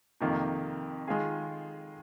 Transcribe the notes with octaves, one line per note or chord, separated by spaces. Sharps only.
F2 C3 D#3 A#3
D#3 G#3 F4 G#4